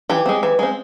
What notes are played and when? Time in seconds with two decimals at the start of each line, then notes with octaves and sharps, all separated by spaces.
0.09 E3 G4
0.26 G#3 C4
0.43 E3
0.59 G#3 C4